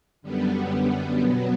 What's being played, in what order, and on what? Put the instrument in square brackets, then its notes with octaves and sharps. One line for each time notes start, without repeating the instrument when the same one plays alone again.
[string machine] F#2 D3 G3 B3
B2 F#3 B3